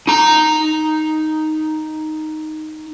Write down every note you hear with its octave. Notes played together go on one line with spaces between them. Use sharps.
D#4 A#5